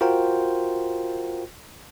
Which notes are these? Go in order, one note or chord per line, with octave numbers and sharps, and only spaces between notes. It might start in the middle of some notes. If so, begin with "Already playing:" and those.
F4 F#4 A#4 C5 G5